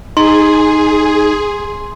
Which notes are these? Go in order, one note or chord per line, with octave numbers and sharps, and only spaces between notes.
D#4 G#4 C6